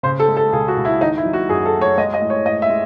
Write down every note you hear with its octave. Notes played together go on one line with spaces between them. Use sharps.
C#3 C5
A4
G#3
A4
C#2 G#4
F#4
C#2
E4
D#3 D#4
E4
F#3
F#4
F#2 G#4
A4
A3
C#5
G#3 D#5
D#5
A2
C#5
A2 D#5
E5
G#3